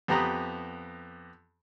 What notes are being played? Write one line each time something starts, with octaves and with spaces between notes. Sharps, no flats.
F2 B3 G4 A#5 B5 D#6